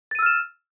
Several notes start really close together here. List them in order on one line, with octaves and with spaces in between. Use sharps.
A6 D#7 E6 F6 E7